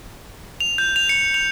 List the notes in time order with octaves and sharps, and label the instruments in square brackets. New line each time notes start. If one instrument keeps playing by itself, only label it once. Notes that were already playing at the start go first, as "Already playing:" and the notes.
[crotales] F7
G6
F7
C#7
F7